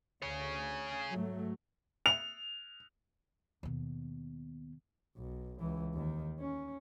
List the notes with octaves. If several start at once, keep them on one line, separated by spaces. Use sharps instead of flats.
D2 G#4 C#5
G#2 F#3 A3
F7
D#2 B2
B1
C#2 E3
D#2 D#3
C#4